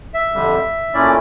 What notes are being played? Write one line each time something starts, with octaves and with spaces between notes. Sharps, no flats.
E5
F2 D3 G3
A#2 A3 C#4 E4 D5